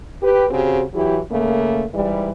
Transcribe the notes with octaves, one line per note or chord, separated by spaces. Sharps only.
G4 B4
C#3 C4 F#4 G4
E3 F#3 E4 G4
C#3 A3 A#3
G#2 E3 G3